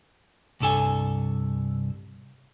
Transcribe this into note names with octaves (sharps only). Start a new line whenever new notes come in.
C2 G2 A4 G#5